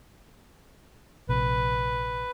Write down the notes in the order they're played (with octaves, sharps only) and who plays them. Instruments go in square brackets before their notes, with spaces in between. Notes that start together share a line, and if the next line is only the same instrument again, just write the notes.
[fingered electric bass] A#1 C3 [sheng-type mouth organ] B4